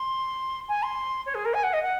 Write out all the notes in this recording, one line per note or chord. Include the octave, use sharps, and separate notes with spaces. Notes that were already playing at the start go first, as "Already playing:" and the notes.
Already playing: C6
G#5
C6
C#5
G#4
A#4
G#5
F#5
D#5
F#5